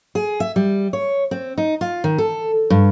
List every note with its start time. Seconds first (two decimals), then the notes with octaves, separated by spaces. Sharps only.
0.15 G#4
0.40 E5
0.56 G3
0.93 C#5
1.31 C4
1.58 D#4
1.81 F4
2.04 D#3
2.18 A4
2.70 G2